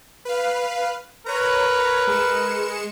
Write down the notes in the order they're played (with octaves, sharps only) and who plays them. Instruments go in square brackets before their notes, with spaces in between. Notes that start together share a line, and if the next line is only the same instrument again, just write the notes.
[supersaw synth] B4 F5
[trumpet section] A#4 B4 [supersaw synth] C#5 A#5
[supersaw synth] G#3 C#7 E7